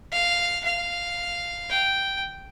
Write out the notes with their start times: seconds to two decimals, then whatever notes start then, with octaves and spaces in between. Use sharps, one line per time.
0.12 F5
0.64 F5
1.70 G5